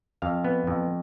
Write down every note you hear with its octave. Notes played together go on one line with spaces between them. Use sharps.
F2 F5
B3
F2